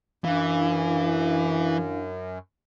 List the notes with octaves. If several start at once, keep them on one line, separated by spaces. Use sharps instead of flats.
F#2 E3 D4 E4 F5